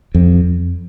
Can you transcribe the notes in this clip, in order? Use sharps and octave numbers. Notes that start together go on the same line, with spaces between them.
F2